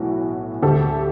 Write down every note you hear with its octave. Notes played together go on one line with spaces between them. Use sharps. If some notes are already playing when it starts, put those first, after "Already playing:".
Already playing: B1 A2 E3 F#4
D2 D3 G4 A4